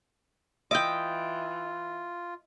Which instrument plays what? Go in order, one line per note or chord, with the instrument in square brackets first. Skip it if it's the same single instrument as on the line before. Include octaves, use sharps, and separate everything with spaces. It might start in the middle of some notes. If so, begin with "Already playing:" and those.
[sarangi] E3 [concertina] F4 [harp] D#5 E5 [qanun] G5 D6